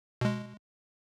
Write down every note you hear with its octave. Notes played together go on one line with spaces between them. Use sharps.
B2 G#3